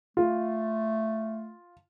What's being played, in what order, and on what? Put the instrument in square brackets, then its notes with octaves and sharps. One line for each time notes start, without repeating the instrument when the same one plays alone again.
[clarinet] A3 [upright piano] F4